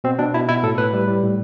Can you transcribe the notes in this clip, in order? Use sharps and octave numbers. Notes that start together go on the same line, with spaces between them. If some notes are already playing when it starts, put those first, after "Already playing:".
B2 C4
B2 D4
B2 E4
B2 E4
A2 A4
A2 B4
G3
G3
A2